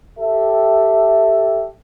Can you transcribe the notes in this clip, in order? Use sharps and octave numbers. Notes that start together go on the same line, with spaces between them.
G4 A4 E5